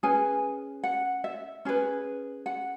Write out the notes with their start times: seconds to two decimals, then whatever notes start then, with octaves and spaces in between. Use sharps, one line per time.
0.03 C#4 G#4 B4 G#5
0.84 F#5
1.24 E5
1.65 C#4 G#4 B4
2.46 F#5